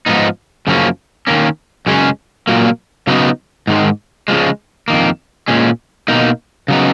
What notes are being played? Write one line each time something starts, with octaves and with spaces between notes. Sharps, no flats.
G#2 F3 B3 D#4
F#2 C#3 F3 A#3 C#4
D#3 A#3 C#4
F#2 C#3 G#3 C#4
A#2 F#3 A#3
C#3 F#3 B3 D#4
G#2 D#3 G#3
C#3 F3 G#3
F2 D#3 A#3
A#2 G#3 C#4
B2 A#3 D#4
C#3 F#3 B3 D#4